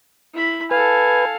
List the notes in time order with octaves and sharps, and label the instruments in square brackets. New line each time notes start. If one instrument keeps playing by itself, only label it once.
[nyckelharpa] E4 B5
[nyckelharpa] A4 F5 [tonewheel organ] B4 [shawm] G#5